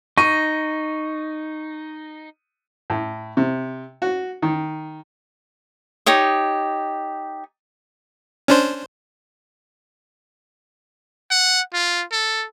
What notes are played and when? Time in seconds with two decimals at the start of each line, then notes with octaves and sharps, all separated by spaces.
0.18 D#4 C#6 D#7
2.90 A2
3.37 C3
4.02 F#4
4.42 D#3
6.06 D#4 G4 C#5 D#6
8.48 C#4 D4 C5
11.31 F#5
11.73 F4
12.12 A4